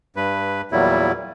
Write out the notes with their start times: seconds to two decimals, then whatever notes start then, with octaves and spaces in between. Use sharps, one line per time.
0.16 G2 B4
0.72 E2 A#2 F#3 G3 E4